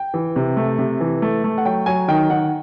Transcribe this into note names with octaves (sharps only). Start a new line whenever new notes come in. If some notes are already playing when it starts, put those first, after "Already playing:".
Already playing: G5
E3
C3
A3
C3
E3
A3
A3
F#5
F#3 G5
F#3 G#5
D#3 G5
D#3 F#5